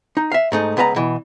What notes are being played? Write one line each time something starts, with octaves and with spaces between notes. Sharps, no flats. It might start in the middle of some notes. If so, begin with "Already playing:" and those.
D#4
E5 F5
G#2 A3 D#4
C#2 B3 B4 E5 A#5
B2 E3